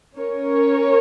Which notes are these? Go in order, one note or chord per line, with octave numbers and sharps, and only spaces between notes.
C#4 A#4 C#5